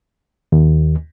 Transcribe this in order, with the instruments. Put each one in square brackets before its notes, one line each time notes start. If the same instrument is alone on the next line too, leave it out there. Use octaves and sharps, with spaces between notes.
[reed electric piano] D#2